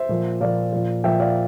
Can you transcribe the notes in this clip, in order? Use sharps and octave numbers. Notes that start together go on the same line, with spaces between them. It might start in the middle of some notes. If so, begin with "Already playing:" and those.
Already playing: C5 E5
A#2 F3
A#2 F3 D5 F5
A#2 F3
A#2 F3 E5 G5
D5 F5